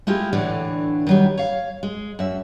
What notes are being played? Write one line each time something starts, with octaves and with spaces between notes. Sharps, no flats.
G#3 A3 E4 F4 G4
A2 D3 E3 A3 D4
D#3 F#3 G3
C#5 F5
G#3
F#2 E5